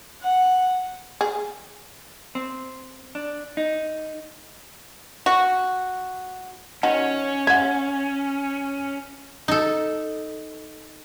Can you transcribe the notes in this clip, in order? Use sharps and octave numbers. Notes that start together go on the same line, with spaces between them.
F#5
G#4
C4
D4
D#4
F#4
D#3 C#4 F#4
E5 F#5 G#6
D#4 A4